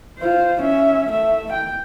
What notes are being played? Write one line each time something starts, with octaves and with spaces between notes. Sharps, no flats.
F4 C5
C#4 E5
A3 E5
G5